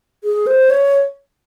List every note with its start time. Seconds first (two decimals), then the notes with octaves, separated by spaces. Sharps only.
0.24 G#4
0.47 C5
0.70 C#5